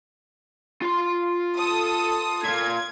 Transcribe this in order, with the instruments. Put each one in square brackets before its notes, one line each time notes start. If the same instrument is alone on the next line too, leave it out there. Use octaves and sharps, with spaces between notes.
[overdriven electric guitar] F4 C6
[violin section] A4 D#6
[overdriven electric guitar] A#2 F4 [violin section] G#6